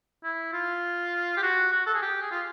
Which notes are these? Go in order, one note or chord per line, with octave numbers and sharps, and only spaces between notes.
E4
F4
G4
F#4
F#4
A4
G#4
G4
G#4
F4